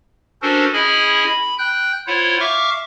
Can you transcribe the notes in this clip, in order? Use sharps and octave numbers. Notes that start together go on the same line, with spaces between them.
C#4 D4 F#4 A4 A#4 C5
C#4 E4 G#4 D#5 G#5 B5
B5
G5 F#6 G6
E4 F4 C5 C#5 F#5
E5 F5 C#6 D6 F6